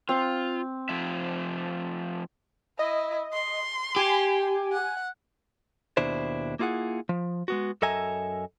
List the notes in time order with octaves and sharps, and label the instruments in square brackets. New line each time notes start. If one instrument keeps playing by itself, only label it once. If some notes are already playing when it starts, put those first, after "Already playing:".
[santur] C4 [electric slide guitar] F4
[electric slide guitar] F3 A3 E5
[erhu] E4 [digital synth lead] D#5
[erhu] C6
[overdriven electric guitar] G4 [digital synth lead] G#5
[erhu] F#5
[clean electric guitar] D#2 B2 D4 E4 C5
A#3 E4 F4 G#4 F#5
F3
G#3 B3 F#4
F#2 A4 D#5 E5 G#5 A#5